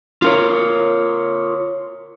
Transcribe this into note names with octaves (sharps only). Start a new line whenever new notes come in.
F4 A#4 C#5